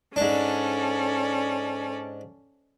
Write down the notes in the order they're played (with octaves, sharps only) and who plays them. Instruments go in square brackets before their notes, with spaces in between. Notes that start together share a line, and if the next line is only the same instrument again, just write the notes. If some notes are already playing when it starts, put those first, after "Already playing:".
[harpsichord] G#2 D4 [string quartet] C#4 A4 D5